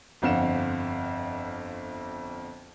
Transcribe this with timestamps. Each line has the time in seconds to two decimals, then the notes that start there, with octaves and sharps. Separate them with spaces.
0.22 G1 F2 C4 F5 F#5 E7